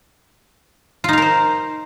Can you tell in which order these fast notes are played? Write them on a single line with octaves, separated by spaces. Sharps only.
F4 D#4 F5 A#4 C5